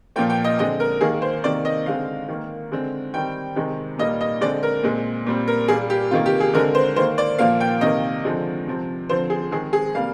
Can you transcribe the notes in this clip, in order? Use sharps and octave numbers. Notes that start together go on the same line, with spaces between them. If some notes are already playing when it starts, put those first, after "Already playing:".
A#2 F3 A#3 G5
G5
D#5
D3 G#3 C4 D#5
A#4
D#3 A#3 G#4
C5
C3 D#3 A#3 D5
D#5
D3 G#3 C4 F5
D#3 A#3
D3 G#3 C4
D#3 G3 C4 G5
C3 D#3 G#3 C4
A#2 G3 A#3 D#5
D#5
D3 G#3 C4 D5
A#4
A#2 G#3 C4
A#2 G3 C4
A#4
A#2 G3 A#3 G#4
G4
C3 D#3 A#3 F4
G4
G#4
D3 G#3 C4 A#4
C5
D#3 A#3 C5
D5
A#2 F3 A#3 F5
G5
C3 D#3 A#3 D#5
D3 F3 G#3 C4
C3 F3 C4
D3 F3 C4 C5
G#4
D#3 G#3 C4 G#4
G#4
C3 G3 A#3 F5